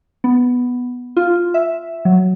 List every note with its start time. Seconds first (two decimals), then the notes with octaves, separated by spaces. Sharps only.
0.24 B3
1.17 F4
1.54 E5
2.05 F#3